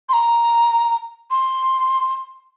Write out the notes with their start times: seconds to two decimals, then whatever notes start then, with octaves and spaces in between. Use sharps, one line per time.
0.09 C6
0.13 A#5
1.31 C6